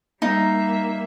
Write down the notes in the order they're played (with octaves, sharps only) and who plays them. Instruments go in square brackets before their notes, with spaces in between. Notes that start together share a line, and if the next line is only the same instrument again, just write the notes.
[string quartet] G3 A#3 E5 [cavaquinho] D#4